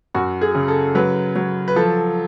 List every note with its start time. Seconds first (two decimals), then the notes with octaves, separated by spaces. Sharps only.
0.15 F#2 F#4
0.41 G#4
0.55 C#3
0.68 A4
0.95 F#3 B4
1.36 F#3
1.68 B4
1.76 F3 A4